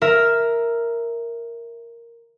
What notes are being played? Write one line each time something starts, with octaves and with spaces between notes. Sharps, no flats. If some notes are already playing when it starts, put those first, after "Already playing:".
A#4 E5